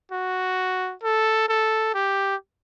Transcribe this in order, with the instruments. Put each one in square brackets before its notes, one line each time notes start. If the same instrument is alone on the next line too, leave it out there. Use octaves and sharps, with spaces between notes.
[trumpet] F#4
A4
A4
G4